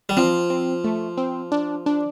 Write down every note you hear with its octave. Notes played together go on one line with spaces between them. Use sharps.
G3
F3 C4
C4
A3
C4
D4
D4